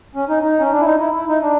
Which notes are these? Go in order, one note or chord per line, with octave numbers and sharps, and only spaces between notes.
C#4
D#4
D#4
C#4
D4
E4
D#4
E4
E4
D#4
D4